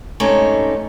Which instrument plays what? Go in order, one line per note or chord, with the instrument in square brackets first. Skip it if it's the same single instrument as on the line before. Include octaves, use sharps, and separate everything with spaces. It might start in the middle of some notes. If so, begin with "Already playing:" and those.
[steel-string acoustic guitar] G#2 C3 A3 C#4 D#4